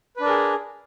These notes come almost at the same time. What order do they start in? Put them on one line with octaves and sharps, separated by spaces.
B4 D4 A#4 G#4